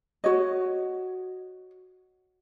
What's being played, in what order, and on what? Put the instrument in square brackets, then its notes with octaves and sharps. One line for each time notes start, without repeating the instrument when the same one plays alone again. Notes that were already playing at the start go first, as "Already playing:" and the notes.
[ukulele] F#4 C#5 D#5